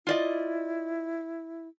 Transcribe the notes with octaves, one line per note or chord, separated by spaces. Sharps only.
E4 F4 D5 D#5